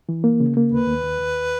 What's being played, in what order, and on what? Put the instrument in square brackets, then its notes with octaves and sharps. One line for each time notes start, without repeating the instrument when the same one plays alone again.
[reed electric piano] E3
A#3
C#3
A#3
[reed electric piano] D#2 [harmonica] B4
[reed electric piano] D#2
D#2
D#2